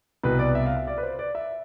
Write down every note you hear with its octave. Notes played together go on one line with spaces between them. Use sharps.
C2 B2 B4
D5
E5
F5
E5
D5
B4
C5
D5
E5